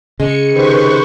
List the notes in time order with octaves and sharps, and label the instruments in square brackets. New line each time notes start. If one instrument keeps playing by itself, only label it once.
[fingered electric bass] C#3 [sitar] G#3 [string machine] C#7
[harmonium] C3 D#3 [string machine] B4 C5 C#6